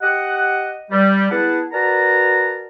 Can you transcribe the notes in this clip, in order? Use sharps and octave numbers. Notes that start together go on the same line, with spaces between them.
G4 D#5 F#5
G3
B3 E4 G#4 B4 F#5 A5
F#4 A#4 B4 D5 A5 A#5